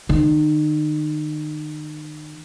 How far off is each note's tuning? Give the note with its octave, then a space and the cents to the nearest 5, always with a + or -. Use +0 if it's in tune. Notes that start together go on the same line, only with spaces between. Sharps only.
D#3 -35